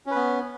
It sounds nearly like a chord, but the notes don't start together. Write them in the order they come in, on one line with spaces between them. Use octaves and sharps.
C#4 B4 B3